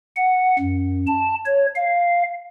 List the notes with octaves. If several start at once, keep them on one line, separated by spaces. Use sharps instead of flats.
F#5
F#2
A5
C#5
F5